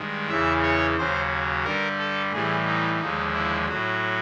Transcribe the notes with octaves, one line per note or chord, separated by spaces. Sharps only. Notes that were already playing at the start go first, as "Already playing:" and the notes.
Already playing: G2 D#3 G#3
E2 C#3 E3 E5
C#5
D#2 C#3 F#3 C5
G2 D3 G3 A#4
A4
A2 E3 G3 G#4
D#4
D#2 D3 F3 G#3 D#4
E4
A2 F#3 F#4